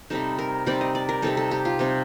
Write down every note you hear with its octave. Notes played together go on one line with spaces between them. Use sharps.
C3 G3 C4 D#4 A4
A#4
C3 G3 C4 D#4 D5
D#5
D5
A#4
C3 G3 C4 D#4 A4
A4
G4
F4
C3 G3 C4 D#4